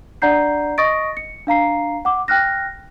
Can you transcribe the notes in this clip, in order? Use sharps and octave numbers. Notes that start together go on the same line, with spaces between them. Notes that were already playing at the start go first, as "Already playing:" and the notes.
D4 D5 F#5 A#5 G6 C7
D#5 C#6 D#6 A6 A#6 D7
C#7
D4 F5 A#5 C7
F#5 D6
G5 F6 F#6 A#6